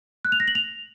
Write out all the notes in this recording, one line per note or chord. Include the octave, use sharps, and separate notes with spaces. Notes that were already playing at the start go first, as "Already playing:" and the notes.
F#6
F7
A#6
F#7
F7